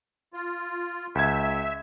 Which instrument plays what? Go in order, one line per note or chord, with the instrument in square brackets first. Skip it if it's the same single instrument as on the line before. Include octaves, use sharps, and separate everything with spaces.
[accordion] F4
[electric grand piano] C#2 G#6 [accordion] E5